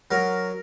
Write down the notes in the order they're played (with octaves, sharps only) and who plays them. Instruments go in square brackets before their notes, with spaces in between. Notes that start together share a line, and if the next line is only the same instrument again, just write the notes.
[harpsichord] F#3 A#4